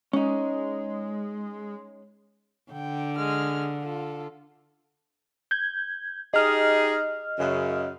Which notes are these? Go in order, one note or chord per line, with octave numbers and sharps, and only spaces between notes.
G#3 C#4 D#4
D3 G5
G#3 F6
F4 A4
G6 G#6
D#4 G4 G#4 D#5 F6
F#2 C#3